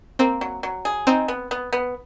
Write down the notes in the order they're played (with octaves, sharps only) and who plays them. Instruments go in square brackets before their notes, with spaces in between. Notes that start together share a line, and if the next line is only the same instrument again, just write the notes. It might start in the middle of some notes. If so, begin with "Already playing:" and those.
[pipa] A#3 [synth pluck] C4
[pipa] F#3
F#3
G#4
[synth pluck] C4 [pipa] D#4
[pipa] B3
B3
B3